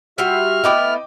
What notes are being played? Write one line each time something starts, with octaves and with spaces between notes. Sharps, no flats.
G3 F4 F#4 E5 F6
A3 B3 E4 D#5 G5 D6